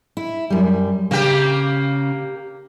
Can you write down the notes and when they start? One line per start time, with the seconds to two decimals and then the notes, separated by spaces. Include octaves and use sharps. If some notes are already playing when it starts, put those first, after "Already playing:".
0.17 E4
0.50 F#2 G3
1.11 C#3 A#3 G4